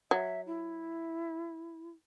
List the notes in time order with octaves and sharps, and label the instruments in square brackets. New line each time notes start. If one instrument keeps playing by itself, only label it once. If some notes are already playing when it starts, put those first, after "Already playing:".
[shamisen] F#3 [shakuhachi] E5
[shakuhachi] E4